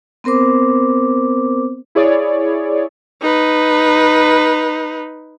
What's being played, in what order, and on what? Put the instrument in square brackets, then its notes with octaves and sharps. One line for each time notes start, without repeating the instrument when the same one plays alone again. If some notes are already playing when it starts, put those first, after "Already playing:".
[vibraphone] B3 C4 A#4 C5 D6
[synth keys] E4 G#4 C#5 D5
[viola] D#4 B4